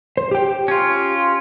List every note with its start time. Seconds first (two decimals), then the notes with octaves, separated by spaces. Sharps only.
0.17 C5
0.31 G4 G5
0.68 C#4 F4